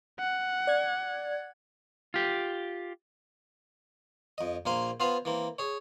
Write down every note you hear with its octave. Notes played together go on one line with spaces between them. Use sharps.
F#5
D5 G#6
F4 G4
F2 D#5
A#1 A#3 C5 F5 G#5 C6
B3 F4 C5 F5 G#5 A#5
E3 A#3 C4
G#4 C#5